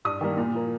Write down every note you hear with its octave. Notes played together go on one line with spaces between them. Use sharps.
G2 D#6
D#3 G3 A#3
A#2
F3 A#3